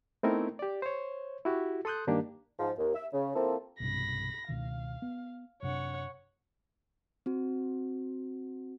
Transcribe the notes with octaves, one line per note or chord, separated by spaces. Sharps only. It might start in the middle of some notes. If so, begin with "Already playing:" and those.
A3 B3 C4 D#4 E4 A#4
G4 D5
C5 C#5
E4 F#4 G4
A4 C6 D#6 F#6 G6
G2 D#3 A#3 D4 G4
G#2 F3
D#2
E5
C#3
F3 A#3 C4 E4 A4
B1 G2 C3 B5 A#6
C#2 B2 D#3 F5
B3
F#2 C3 D4 C#5 F#5
C4 F#4